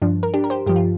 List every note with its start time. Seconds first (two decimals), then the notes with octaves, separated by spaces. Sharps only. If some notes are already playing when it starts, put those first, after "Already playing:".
0.02 G2 F3 D4
0.23 A#4
0.34 D4 G4
0.44 A#4
0.50 G4 C5
0.66 G2 F3 G4
0.76 F4